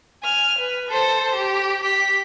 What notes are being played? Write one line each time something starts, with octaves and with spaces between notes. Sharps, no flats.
G#5 F6
B4
A4 C5
G4
G4 B6